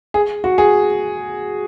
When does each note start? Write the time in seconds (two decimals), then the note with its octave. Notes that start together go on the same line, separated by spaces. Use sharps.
0.14 G#4
0.44 F#4
0.58 G#4